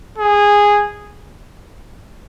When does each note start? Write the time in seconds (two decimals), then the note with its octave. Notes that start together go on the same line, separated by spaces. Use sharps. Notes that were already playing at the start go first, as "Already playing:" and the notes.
0.18 G#4